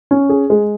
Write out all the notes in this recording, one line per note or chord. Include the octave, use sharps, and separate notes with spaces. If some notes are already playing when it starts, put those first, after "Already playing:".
C#4
G#4
G#3